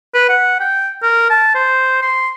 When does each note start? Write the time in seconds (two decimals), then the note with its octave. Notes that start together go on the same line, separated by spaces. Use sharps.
0.15 B4
0.29 F#5
0.60 G5
1.03 A#4
1.30 A5
1.55 C5
2.02 C6